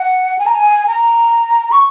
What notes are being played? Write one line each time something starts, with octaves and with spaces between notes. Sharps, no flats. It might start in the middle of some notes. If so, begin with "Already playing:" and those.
Already playing: F#5
G#5
A#5
G#5
A#5
C#6